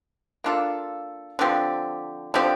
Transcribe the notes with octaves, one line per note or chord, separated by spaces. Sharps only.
A#3 D4 F4 A4
D3 F3 C4 G4
D3 F3 C4 G4